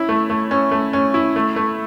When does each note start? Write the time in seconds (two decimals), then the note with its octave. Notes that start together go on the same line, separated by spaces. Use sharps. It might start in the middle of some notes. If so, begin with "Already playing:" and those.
Already playing: C#4 E4
0.09 A3
0.30 A3
0.51 C#4
0.71 A3
0.93 C#4
1.14 E4
1.36 A3
1.56 A3